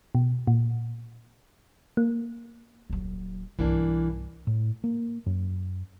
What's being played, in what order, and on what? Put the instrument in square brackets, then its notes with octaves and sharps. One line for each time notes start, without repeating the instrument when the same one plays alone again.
[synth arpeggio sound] B2
A#2
A#3
[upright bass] D#1 F#3
[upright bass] B1 G2 [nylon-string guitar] E3 A#3 D4
[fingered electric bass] A2
A#3
F#2